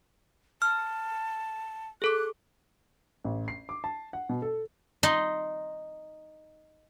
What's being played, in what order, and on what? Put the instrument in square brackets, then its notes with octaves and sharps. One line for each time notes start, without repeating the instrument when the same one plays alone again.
[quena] A5 [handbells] F6
[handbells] G#4 A4 D6 [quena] F#6
[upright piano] A1
C7
D6
A5
F#5
B2
A4
[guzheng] D#4 C6